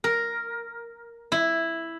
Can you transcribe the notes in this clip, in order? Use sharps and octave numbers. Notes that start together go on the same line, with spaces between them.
A#4
E4